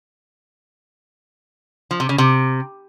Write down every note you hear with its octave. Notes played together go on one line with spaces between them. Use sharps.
F3
C3
C#3
C3